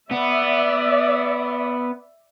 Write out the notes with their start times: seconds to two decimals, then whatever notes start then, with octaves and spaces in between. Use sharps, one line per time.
0.11 B3 D5 E5